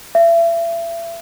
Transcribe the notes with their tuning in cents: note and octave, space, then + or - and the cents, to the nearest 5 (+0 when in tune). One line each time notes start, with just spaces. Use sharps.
E5 +35